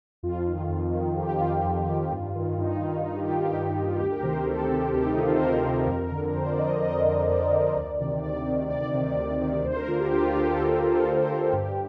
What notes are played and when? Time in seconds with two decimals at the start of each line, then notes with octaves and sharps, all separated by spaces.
0.23 F2 F4
0.47 D#3
0.69 F2
0.94 D#3
1.16 F2 G4
1.29 G4
1.40 D#3 F4
1.53 F4
1.64 F2
1.88 D#3
2.12 G2
2.35 D#3
2.58 G2 D#4
2.75 D#4
2.82 D#3
3.05 G2 D#4
3.17 G4
3.28 D#3 F4
3.41 G4
3.52 G2 F4
3.76 D#3
3.88 F4
3.99 D2 G4
4.12 A#4
4.23 C3 D#3 C5
4.34 A#4
4.47 D2 A4
4.59 A4
4.70 C3 D#3 G4
4.94 D2 G4
5.06 D#4
5.17 C3 D#3 F4
5.28 A4
5.36 C5
5.41 D2 A#4
5.64 C3 D#3
5.87 F2
6.12 D3
6.34 F2 C5
6.46 D5
6.59 D3 D#5
6.82 F2 D#5
7.06 D3
7.29 F2 D5
7.52 D3
7.76 D2
8.00 C3 D#3
8.24 D2 D5
8.46 C3 D#3
8.70 D2 D5
8.94 C3 D#3
9.18 D2
9.41 C3 D#3
9.64 D2 C5
9.76 A#4
9.88 D3 F4
10.00 G4
10.11 D2 G4
10.23 F4
10.35 D3 G4
10.47 A4
10.58 D2 G4
10.70 G4
10.82 D3 F4
10.94 A4
11.05 D2 A#4
11.17 C5
11.29 D3 A#4
11.42 A4
11.53 G2 G4